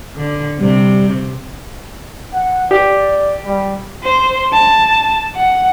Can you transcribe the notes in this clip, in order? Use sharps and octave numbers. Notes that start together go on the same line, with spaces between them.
D3
C3 G3
F#5
G4 D5
G3
C5
A5
F#5